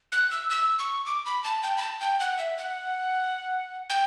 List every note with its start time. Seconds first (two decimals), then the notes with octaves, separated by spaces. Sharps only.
0.12 F#6
0.31 E6
0.50 E6
0.79 C#6
1.06 D6
1.26 B5
1.44 A5
1.63 G5
1.78 B5
1.82 A5
2.00 G5
2.20 F#5
2.38 E5
2.58 F#5
3.90 G5